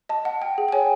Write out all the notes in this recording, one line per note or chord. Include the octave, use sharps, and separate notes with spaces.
D#5 A5
F#5
G5
G#4
G5
C#5 G#5